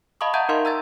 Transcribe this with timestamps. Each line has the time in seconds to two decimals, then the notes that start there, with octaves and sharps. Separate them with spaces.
0.21 D#5 F5 A5 B5 C#6 D#6
0.34 E5 F#5 A5 A#5 G6 G#6
0.49 D#4 A#4 D#5 F5 C6
0.65 A#5 E6 G#6 A6